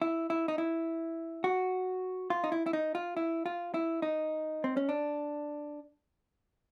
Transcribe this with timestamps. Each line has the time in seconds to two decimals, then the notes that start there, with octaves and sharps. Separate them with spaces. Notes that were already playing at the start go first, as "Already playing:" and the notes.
0.02 E4
0.30 E4
0.48 D#4
0.58 E4
1.44 F#4
2.30 F4
2.44 D#4
2.52 E4
2.66 E4
2.73 D#4
2.95 F4
3.17 E4
3.46 F4
3.74 E4
4.02 D#4
4.64 C4
4.77 C#4
4.89 D4